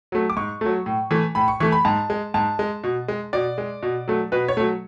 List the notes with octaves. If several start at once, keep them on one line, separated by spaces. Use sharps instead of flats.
F#3 A3
D6
G#2 C#6
F#3 A3
A2
E3 A3
A2 B5
C#6
E3 A3 C#6
B5
G#2 A5
G#3
G#2 A5
G#3
B2
G#3
B2 D5
G#3
B2
F#3 A3
B2 B4
C#5
F#3 A3